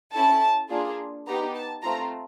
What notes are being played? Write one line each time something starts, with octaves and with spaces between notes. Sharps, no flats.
C#4 E4 A4 A5
A#3 D4 F4 G#4
B3 D#4 G4 A#5
A5
A3 C4 F4 A#5